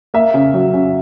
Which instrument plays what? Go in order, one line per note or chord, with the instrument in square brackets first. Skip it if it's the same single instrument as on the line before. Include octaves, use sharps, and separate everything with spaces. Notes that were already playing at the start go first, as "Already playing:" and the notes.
[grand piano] A#3 [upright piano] E5
[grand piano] C#3
F#3
C#3